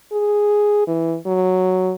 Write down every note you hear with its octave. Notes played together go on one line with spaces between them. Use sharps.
G#4
E3
F#3